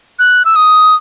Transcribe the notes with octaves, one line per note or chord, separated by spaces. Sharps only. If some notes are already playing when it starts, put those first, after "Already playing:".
F#6
E6
D#6